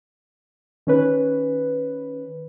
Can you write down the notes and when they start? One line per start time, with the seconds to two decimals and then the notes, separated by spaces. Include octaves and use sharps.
0.87 D#3 C#4 B4